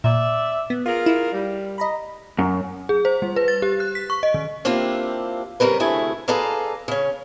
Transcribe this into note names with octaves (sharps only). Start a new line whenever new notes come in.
A#2 D5 E5
B3
F4 G#4 A#4
E4
G3
D#5 A#5 B5
F#2
G#4
C5
G3
B4
A6
G4
F#6
B6
C#6
D#5
D#3
A#3 C4 D4 E4 F4 G4
C#3 G3 C4 A#4 B4
D2 C3 A3 E4 G#4 G#5
G#4 A4 B4 D5 F5 A#5
C#3 C#4